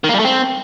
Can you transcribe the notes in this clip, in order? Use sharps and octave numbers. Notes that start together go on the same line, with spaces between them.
D#3
A#3
G3
A3
C4